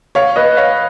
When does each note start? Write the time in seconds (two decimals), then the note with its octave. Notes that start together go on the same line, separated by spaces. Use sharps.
0.15 C#5 F5
0.36 B4 D#5
0.57 C#5 F5